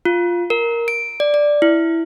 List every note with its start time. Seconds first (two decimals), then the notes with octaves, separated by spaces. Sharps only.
0.05 F4
0.50 A#4
0.88 D7
1.20 D5
1.34 D5
1.62 E4